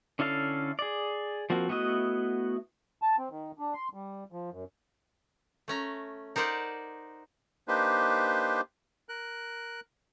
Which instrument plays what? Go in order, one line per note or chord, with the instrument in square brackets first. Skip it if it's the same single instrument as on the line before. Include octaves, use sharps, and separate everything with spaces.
[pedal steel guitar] D3 C#4 E4 A4 F5
G#4 D5
F3 A#3 C4 F#4
A3 B3 E4 F#4 D#5
[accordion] A5
C4
D#3
D4
C6
G3
F3
F#2
[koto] A3 C#4 A#5
D#4 A#4 C5 D5 F#5
[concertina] A#3 D4 D#4 G4 B4 C5
A#4 F#6